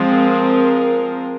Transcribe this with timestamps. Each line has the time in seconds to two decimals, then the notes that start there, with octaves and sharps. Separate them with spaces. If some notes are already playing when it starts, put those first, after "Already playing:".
Already playing: F3 G#3 C4
0.12 A#4